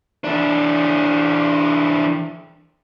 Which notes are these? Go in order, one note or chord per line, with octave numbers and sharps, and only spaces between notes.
E3 D4